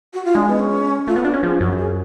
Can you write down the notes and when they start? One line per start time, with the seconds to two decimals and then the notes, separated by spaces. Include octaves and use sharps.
0.14 F#4
0.25 F4
0.35 G#3 D4
0.48 B3
0.59 C#4
1.07 A3 F4
1.16 B3
1.25 D4 F#4
1.34 C#4
1.43 F3 G#4
1.60 F#2 F#4
1.78 G#4